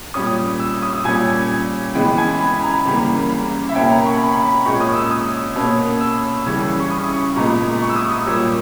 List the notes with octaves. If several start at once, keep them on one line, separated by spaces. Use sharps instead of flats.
A#2 G3 C#4 D#6
E6
D#6
A#2 G3 C#4 G#5
C#3 E3 G#3 B3 G5
G#5
B5
A#5
E2 C#3 G3 A#3
E5
B2 A#3 C#4 G5
A#5
C#6
B5
A#5
B5
A#2 G#3 C#4 C#6
D#6
E6
D#6
B2 A#3 C#4
E6
C#3 E3 G3 C#4
C#6
D#6
C#6
A#2 G#3 B3 A#5
C#6
E6
D#6
D#6
A#2 G3 A#3 C#4 E6